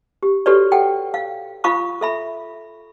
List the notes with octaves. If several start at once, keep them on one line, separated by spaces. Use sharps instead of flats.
G4
F#4 G4 A4 B4 C#5 D5
A4 F#5 G5
F5
F4 F5 B5 C#6 D#6
A4 E5 B5